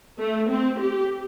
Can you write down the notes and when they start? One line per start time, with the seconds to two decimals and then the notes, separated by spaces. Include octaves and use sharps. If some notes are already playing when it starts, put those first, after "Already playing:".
0.19 A3
0.50 C4
0.80 G4